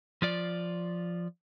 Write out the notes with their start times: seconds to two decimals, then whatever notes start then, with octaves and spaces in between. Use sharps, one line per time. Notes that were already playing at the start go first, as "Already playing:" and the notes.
0.22 F3 F4 D5